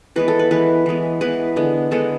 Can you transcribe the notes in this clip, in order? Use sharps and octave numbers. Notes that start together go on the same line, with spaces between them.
E3 G#3 B3 B4
A4
B4
E3 G#3 B3 B4
E3 G#3 B3
E3 G#3 B3 B4
D3 G#3 B3
D3 G#3 B3 A4